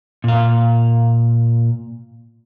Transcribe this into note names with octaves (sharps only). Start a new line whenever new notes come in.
A#2 F5